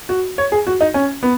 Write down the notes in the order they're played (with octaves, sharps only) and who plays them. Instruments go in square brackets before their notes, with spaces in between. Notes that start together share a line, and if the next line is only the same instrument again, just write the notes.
[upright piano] F#4
C#5
G#4
F#4
D#4
C#4
B3